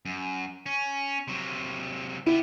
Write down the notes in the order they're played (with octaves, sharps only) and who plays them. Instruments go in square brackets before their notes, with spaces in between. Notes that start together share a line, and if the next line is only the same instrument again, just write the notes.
[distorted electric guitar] F#2
C#4
C3 F#3
[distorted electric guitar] B3 G4 [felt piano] E4